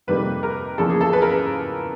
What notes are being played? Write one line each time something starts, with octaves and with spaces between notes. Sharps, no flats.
F2 C3 D#3 G3 A#3 B4
A#4
E2 C#3 F3 A#3 A4
G#4
A4
B4
A#4
B4